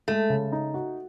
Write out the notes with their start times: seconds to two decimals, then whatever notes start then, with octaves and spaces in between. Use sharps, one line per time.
0.08 G#3 A3
0.30 C#3
0.52 D#4
0.74 F#4